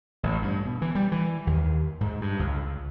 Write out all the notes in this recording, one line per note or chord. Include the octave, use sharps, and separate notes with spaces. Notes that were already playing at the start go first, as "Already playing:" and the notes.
A1
G2
B2
E3
G3
E3
D#2
G#2
G2
C#2